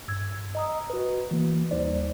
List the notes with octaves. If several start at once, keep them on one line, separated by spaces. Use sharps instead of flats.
G2 E6 G#6
D#5 A#5 D#6
F#4 B4
E3 A#3
D#2 G3 D#4 C5 D5